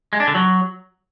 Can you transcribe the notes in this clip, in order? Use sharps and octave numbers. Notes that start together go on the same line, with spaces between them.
G#3
D4
D3
F#3